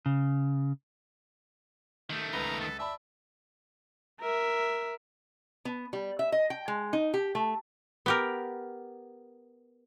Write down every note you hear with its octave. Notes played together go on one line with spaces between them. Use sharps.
C#3
D#3 A3 G4
C#2 B4 A#5 G7
A4
D5 E5 A5 B5
A#4 E5
B3
G3
E5
D#5
G5
G#3
D#4
G4
A3
B3 G4 A#4